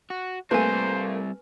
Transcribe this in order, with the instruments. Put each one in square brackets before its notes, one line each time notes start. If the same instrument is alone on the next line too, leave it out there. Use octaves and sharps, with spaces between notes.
[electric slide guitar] F#4
[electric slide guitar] G3 C4 [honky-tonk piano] A3 A#3 [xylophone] B4 G#5 [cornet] C5